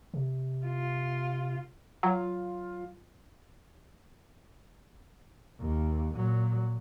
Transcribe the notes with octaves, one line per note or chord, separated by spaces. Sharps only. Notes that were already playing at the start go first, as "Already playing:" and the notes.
C3
F4
F#3 F4
D#2
A#2 F#3